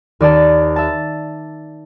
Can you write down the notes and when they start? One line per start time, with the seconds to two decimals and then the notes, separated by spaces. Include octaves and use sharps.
0.20 D#2 D5 D#5 A5
0.76 E5 A5